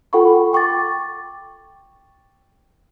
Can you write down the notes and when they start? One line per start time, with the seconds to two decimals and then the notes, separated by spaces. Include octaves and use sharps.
0.13 F4 A4 F#5 G5 B5 C#6
0.53 G5 C#6 D6 A6